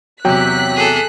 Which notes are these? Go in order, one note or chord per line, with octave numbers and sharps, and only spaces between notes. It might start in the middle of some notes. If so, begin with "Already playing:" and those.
E2 C3 F#3 G5 F#6 B6
G#4 A4